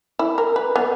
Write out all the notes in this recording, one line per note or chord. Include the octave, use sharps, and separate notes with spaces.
E4
A#4
B4
B3